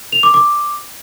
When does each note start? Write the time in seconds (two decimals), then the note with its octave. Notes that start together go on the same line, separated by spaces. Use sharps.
0.12 F7
0.23 D6
0.34 D6